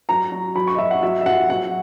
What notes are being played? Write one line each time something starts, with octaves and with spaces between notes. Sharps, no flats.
F#3 A#5
F#3
F#3 B5
C#6
D#5
F#3 E5
F#5
F#3 E5
E5
F#3 F#5
F#3 F#5